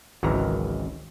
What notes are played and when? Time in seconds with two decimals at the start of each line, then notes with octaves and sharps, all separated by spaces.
0.23 G#1 C#2 D#3 E3 F#3 A#5